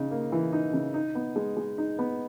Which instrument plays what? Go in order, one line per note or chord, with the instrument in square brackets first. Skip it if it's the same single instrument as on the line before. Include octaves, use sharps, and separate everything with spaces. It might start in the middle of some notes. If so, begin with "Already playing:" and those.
Already playing: [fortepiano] C#3 D#4
A#3
E3
D#4
C#3
D#4
B3
G#3
G#3
D#4
B3